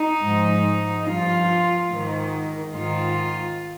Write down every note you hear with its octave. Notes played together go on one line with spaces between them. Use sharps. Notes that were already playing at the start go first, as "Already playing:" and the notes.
Already playing: D#4
G#2 F3
G2 F3 F4
G#2 D#3
G#2 D#3 F4